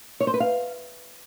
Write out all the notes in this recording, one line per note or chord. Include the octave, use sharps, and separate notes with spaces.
C#5
C5
B4
F5